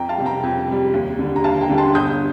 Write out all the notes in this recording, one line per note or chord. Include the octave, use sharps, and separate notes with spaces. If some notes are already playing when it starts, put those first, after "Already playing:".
Already playing: F2 G5 A#5
F5 A5
C3 G3
G5 A#5
F2
C3 G3
D#2
D3 G3
A#5
D#2 F5 A5
G5 A#5
D3 G3
A5 C6
G1 D#6 G6